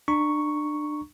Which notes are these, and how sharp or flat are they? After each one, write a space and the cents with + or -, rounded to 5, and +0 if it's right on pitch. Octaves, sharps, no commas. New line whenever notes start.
D4 +30 A#5 +0 C#6 +0